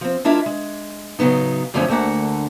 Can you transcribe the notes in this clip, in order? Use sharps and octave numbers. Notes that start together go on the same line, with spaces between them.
F3 C4
G#3 D4 E4 F4 A#4
G#3
A2 C#3 F#3 B3 D#4
F#2 D3 F3 A3 C4 C#4
D2 D3 A3 A#3 F#5